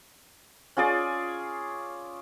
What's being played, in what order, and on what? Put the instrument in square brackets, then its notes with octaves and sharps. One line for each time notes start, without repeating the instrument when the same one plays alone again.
[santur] C#4 F4 G#4 D5